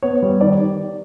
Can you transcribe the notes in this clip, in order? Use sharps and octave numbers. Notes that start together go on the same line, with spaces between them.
B3 C#5
G3
D#3 D5